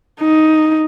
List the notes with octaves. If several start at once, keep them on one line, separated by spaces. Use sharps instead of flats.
D#4